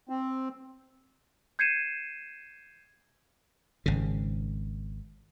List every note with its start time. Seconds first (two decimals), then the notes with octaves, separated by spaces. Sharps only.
0.09 C4
1.59 G6 G#6 C7 C#7 D#7 E7
3.86 G#1 C#3